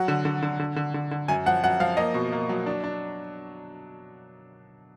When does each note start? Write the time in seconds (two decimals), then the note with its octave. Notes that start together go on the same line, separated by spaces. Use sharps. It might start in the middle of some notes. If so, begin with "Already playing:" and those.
Already playing: F#3 F#5
0.08 D3
0.25 D3
0.43 D3
0.60 D3
0.76 D3
0.94 D3
1.11 D3
1.28 F#2 G#5
1.46 F3 F#5
1.64 F#2 F#5
1.80 F3 F5
1.97 A#3 D#5
2.14 B2
2.32 A#3
2.49 F#3
2.66 D4
2.84 D4